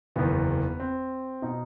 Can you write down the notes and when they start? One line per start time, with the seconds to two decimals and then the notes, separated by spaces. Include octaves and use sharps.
0.16 F#1 E2 D#3 B3
0.80 C4
1.42 B2 D#4